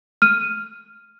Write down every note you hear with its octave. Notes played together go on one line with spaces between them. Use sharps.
F6 D#7